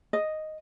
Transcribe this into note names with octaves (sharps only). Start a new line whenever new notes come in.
D#5